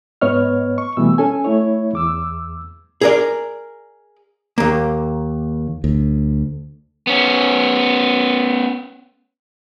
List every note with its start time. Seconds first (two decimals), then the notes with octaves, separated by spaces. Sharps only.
0.21 G#2 B3 B4 C#5 D#5 F6
0.78 C#6
0.97 B2 E3 G3 A3 B3 E6
1.18 C#4 A4 G#5
1.45 A3 E4 C#5
1.93 E2 D6 E6
3.01 G#4 A#4 D5
4.58 D#2 A#3
5.84 D2
7.07 B3 C#4